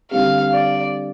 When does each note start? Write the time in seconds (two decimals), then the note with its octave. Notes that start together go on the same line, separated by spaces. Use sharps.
0.11 D3 G3 C4 G4 F5
0.53 D5